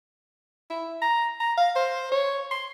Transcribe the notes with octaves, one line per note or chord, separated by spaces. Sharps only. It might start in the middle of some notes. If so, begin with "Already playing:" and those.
E4
A#5
A#5
F5
C5
C#5
C6